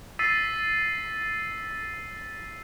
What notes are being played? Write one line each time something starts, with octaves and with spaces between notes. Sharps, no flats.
E6 A6 B6 C7 D#7